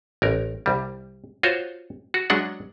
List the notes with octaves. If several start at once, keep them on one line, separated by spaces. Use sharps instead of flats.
A1 A#4
C2 G3
F4 F#4 C5 C#5
F#4
F#3 G#3 D4 F#5